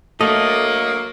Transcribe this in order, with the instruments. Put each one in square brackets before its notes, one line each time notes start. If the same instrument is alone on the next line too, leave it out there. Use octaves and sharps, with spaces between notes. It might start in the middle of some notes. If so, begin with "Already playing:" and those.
[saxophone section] D3 F#3 A#3 [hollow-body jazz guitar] A3 [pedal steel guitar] D#5